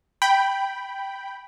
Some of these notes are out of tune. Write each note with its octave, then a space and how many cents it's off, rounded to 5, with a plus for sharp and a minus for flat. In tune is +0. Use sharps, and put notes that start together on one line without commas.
G5 +0 B5 +0